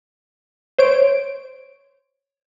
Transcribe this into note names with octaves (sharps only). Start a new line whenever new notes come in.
C5 C#5 D7